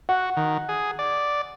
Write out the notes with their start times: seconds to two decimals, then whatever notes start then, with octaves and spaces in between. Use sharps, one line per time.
0.09 F#4 F#5
0.37 D#3
0.69 G#4
0.99 D5